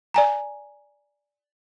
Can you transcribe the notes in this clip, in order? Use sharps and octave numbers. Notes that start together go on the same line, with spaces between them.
D5 G#5 A#5